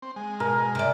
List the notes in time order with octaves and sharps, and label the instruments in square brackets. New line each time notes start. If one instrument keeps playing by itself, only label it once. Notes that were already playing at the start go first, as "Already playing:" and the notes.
[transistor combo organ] C4
G#3
[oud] B2 [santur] A#4
[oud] C3 D5